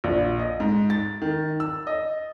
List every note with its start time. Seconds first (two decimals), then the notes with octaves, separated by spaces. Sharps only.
0.04 A#1
0.39 D#5
0.60 G#2
0.90 A6
1.22 D#3
1.60 E6
1.87 D#5